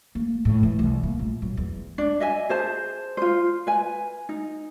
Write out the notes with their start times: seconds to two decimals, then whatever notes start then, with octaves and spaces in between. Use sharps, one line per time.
0.15 A#3
0.45 A2
0.63 E3
0.79 C2
1.03 A#3
1.19 A#1
1.42 F#2
1.57 E2
1.98 D4
2.20 D#5 E5 G#5
2.49 G#4 C5 A5
3.17 F4 C5
3.67 B4 G#5
4.29 D#4